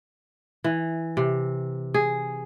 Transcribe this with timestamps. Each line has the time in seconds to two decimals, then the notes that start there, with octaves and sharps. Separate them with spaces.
0.64 E3
1.17 C3
1.94 G#4